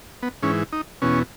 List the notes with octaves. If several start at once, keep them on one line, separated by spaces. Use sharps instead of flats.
B3
G#2 E3 C#4
D#4
E2 B2 C#4